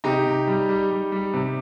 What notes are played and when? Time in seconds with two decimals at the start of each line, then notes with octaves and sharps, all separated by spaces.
0.04 C3 D#4 G4
0.26 C3
0.47 G3
0.69 G3
0.91 G3
1.12 G3
1.34 C3